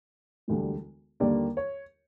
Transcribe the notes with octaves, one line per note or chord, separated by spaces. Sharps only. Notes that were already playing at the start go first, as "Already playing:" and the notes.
E1 D2 D3 G3
D#2 D3 G3 A#3 D5
C#5